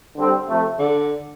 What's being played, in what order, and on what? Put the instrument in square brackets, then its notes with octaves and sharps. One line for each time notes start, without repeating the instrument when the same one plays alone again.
[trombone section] D3 G3 C4
C3 F3 A3
[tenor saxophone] D3